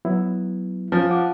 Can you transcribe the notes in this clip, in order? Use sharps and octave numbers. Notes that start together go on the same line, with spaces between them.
F#3 B3 E4
F3 C#4
F#5 D6